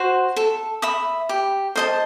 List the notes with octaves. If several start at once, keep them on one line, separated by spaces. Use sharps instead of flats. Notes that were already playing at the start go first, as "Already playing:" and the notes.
Already playing: F#4 C5
A4
E5 B5 D#6
G4
C5 D#5 A5